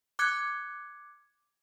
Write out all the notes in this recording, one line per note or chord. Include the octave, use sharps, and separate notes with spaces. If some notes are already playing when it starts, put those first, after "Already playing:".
D6 F#6 G#6 C#7